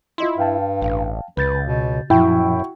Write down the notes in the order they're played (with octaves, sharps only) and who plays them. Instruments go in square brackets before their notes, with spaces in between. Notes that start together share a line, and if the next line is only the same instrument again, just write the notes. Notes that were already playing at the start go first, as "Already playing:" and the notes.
[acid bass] E4 [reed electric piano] F4 D#5 C6
[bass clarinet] G2 [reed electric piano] F5 G5 A5
[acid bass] A1
[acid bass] C#2 [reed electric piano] C#3 G6 A6 [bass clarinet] B4
[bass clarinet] B2
[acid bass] F#2 [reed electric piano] A#2 F3 [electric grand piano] E4 G5 [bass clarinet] F#4